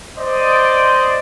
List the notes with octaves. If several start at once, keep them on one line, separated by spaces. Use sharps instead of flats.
C5 D5 D#5